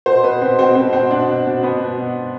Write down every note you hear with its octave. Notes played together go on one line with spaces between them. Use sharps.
B2 C5
B2 B4
B2 C4
B2 C4
B2 C4
B2 C4
B2 D4
B2
B2
B2 B3
B2
B2